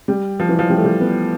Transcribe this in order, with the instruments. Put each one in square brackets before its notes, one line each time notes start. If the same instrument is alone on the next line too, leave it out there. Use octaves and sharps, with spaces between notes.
[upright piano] G3
F3
E3
F3
G3
A3
G3
B3